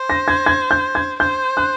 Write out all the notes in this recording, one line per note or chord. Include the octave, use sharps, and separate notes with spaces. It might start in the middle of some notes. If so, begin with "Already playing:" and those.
Already playing: C5
A#6
G#6
G#6
G6
G#6
C5 G6
F#6